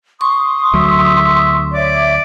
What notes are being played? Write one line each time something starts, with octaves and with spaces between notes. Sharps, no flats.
C6 C#6 D#6
D2 F#3 E5
C#5 D5 E5 D6